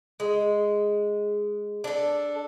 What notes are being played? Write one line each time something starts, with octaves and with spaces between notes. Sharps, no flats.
G#3
D4 A4